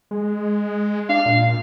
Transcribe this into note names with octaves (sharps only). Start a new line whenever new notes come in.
G#3
D4 F5
A#2